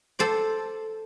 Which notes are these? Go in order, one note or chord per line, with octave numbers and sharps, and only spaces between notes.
A4 C5 D5